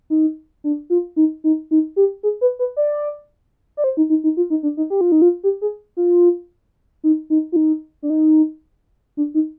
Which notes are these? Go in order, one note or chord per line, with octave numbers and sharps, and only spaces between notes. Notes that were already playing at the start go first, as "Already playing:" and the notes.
D#4
D4
F4
D#4
D#4
D#4
G4
G#4
B4
B4
D5
D5
C5
D#4
D#4
D#4
F4
D#4
D4
D#4
G4
F4
D#4
F4
G4
G#4
F4
D#4
D#4
F4
D#4
D4
D#4
D4
D#4